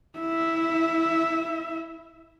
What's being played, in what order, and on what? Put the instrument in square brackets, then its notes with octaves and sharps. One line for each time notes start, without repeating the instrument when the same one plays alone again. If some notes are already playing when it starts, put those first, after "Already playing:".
[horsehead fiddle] E4 E5